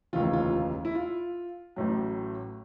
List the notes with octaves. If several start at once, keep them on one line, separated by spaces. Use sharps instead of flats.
F1 D#2 C#3 E3 F4
F4
E4
F4
A1 A2 F#3